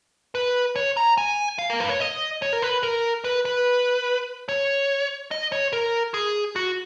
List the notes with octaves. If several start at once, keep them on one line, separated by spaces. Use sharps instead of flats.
B4
C#5
A#5
G#5
F5
A#4
B4
C#5
D#5
C#5
A#4
B4
A#4
B4
B4
C#5
D#5
C#5
A#4
G#4
F#4